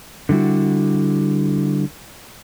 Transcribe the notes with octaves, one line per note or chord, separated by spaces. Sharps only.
D3 F#3 G3 E4 F#4